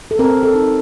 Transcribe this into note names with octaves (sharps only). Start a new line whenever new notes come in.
A4
C4 A#4
A4
D#4